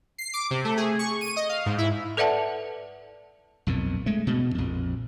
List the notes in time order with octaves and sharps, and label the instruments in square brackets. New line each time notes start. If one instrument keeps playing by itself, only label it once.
[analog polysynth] C7
D6
C3
A3
G#4
C#6
D#7
D#5
F5
G#2
E4
[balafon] A4 B4 D5 E5 F#5 A5
[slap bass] B1 F2 A#2
G#3 A3
B2
A#1 F2